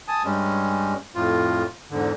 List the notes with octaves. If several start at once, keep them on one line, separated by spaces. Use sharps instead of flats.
G#5 A5 D#6
G2 G3 G#3 C#4
F2 A2 F4
E2 G#2 D3